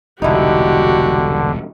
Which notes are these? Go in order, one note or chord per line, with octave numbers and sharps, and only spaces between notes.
E1 C2 D3 D#4 E4 F#4 G4